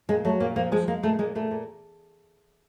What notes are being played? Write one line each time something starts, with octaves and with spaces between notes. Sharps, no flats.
A#2 G#3
F#3 A3
A#2 A#3
F3 A#3
F3 G#3
G#3 A#3
A#2 A3
A#2 G#3
A#2 A3
A#2